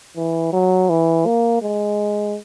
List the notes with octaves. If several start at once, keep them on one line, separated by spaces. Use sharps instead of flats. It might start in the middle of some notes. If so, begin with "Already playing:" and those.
E3
F#3
E3
A#3
G#3